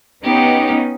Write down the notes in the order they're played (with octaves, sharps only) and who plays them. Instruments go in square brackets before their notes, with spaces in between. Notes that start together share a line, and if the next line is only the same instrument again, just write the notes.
[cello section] B3 C#4 D#4 [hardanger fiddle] G4